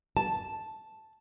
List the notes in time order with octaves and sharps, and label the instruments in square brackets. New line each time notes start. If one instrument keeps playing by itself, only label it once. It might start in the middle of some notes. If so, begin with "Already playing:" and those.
[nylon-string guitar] A5